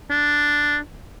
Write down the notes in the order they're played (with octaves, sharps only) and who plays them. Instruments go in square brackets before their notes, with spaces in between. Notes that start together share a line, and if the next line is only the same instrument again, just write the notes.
[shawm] D4